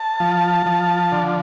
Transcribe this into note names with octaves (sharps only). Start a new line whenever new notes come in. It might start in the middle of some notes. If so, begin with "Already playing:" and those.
Already playing: A5
F3
F3
D3